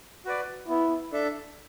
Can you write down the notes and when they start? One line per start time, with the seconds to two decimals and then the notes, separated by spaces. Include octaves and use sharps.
0.25 F#4 B4 D5
0.68 B3 E4
1.12 D4 A4 E5